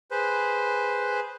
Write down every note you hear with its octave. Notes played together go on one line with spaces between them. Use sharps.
G#4 B4 C5